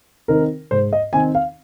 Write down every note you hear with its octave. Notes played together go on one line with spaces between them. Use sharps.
D#3 C4 D#4 A#4
G#2 C5
D#5
D#3 C4 D#4 G#5
F5